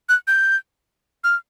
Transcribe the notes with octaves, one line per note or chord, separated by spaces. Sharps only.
F#6
G6
F6